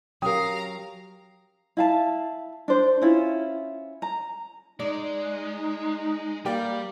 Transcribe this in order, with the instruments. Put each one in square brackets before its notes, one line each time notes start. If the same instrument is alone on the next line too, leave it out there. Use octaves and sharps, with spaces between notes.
[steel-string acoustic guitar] F#3 C#4 A#4 [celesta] G4 G5 [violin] F5 A#5 [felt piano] D#6
[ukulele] E4 F5 A5
D4 C5
C#4 E4 F4
A#5
[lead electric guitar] G#3 [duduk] D#4 [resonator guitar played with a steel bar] D5
[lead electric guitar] G3 [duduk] A#3 [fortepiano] G4 A#4 D5